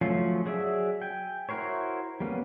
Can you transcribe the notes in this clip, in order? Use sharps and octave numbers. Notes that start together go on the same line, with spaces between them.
F3 F#3 A3 C#4 F4
F#3 G#4 D5 E5
G5 G#5
E4 F#4 A#4 C5 C#5
G3 A#3 B3 C#4